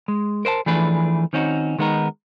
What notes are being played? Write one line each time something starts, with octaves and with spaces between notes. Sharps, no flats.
G#3
A#4 C5 D#5 A5
E3 F3 A3 D4 G#4 B4
D#3 C4 C#4 D#4 F#4
D#3 G#3 B3 D#4 A#4